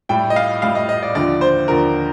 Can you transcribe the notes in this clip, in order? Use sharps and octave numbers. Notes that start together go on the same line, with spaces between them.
A2 G3 G5
D#5
F5
A2 G3 F5
D#5
D#5
D5
D#2 D3 F3 D5
C5
D#2 D3 F3 A#4